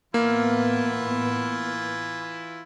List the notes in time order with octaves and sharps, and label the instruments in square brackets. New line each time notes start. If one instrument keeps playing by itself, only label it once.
[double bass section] A2 B3 [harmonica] E3 E4 F4 [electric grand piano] A#3